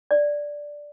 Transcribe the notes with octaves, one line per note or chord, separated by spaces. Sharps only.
D5